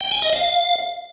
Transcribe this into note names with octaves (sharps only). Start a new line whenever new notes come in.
G5
G#5
D#5
F5